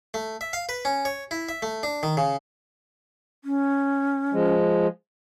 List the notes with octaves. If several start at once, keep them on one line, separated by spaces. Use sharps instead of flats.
A3
E5
F5
B4
C#4
C#5
E4
E5
A3
D4
D#3
C#3
C#4
F3 G#3